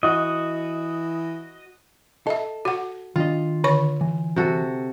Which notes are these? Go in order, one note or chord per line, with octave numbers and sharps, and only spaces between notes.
E3 F#4 D#5
A4 D#5 E5
F#4 F#5
D#3 D4 F4 D#5
D3 C#5 C#6
E3
C3 F#4 A4